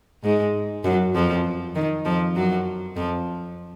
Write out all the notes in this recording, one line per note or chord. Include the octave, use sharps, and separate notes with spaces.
G#2 G#3
F#2 F#3
F2 F3
D#3
F2 F3
F#2 F#3
F2 F3